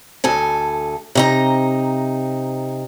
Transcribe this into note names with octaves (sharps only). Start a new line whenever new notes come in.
D2 A4 G#5
C3 D#4 A#5